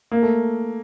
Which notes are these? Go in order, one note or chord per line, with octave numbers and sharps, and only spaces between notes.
A#3
A3